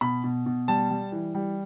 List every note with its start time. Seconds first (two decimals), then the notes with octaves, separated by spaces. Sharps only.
0.01 B2 B5
0.24 B2
0.46 B2
0.68 G3 A5
0.90 G3
1.12 E3
1.34 G3